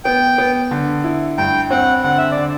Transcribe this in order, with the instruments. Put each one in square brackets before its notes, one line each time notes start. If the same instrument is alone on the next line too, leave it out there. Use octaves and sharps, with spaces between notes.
[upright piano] B3 [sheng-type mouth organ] G5
[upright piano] B3
D3
E4
[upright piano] G2 [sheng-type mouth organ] G5
[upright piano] C4 [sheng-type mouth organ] F#5
[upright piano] D3 [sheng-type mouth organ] F#5
[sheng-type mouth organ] E5
D5
[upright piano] D3